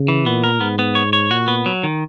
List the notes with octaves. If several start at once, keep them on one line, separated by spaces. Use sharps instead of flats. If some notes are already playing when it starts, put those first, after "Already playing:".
Already playing: C#3
E3
A#2 B3
A#4
G#2 B3
B3
C#5
C#5
A#2 F#4
B3
F#3
D#3